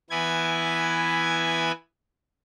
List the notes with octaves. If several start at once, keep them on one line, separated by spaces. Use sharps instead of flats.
E3 B3 E4 G#5 G#6